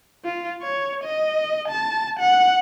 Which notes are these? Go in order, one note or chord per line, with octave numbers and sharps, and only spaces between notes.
F4
C#5
D#5
A5
F#5